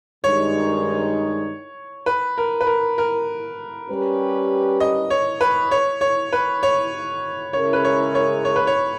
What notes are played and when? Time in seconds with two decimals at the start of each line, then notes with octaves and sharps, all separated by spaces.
0.24 G2 D#3 G#3 D#4 C#5
2.06 B4
2.38 A#4
2.61 B4
2.67 A#4
2.98 A#4
3.89 G3 C#4 G4 B4
4.80 D#5
5.10 C#5
5.41 B4
5.71 C#5
6.01 C#5
6.33 B4
6.63 C#5
7.53 C#3 G#3 C#4 E4 A#4 C#5
7.73 B4
7.84 C#5
8.15 C#5
8.45 C#5
8.56 B4
8.67 C#5